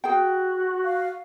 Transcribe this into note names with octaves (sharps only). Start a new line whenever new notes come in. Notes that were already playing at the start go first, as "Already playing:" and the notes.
F#4 G#4 G5
F5